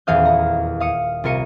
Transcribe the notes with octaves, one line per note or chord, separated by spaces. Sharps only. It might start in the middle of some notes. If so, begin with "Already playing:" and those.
D#1 E2 E3 F5 D#6 G6
A#5
F5 D#6 C#7
C2 F4 A#4 C#7 D#7